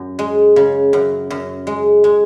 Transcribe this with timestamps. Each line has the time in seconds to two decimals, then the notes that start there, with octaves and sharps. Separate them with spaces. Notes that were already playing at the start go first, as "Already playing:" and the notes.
Already playing: F#2
0.19 G#3
0.56 C#3
0.93 F#2
1.30 F#2
1.67 G#3
2.04 G#3